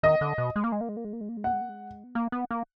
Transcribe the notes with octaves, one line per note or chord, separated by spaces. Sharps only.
D#3 D#5
D3
B2
G#3
A#3
G#3
A#3
G#3
A#3
G#3
A#3
G#3
A#3
G#3
A#3 F#5
G#3
A#3
G#3
B3
A#3
B3
A#3